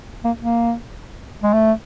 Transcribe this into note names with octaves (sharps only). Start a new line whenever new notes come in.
A#3
A#3
G#3
A3